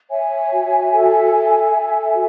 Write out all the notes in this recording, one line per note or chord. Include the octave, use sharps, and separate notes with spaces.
C#5 E5 G#5
F#4
A4
A4
A4
F#4